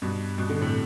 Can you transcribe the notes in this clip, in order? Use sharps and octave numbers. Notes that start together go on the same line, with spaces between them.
G2 B2
G2 B2
B2 D3
A2 C3